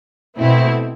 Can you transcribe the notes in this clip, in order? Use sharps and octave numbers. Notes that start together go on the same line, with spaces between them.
B2 A3 C4 E4